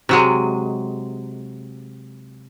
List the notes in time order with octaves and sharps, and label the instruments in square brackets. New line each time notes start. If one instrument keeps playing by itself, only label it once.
[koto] C3 F#3 G#3